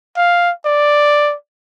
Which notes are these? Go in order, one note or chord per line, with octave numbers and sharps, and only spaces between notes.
F5
D5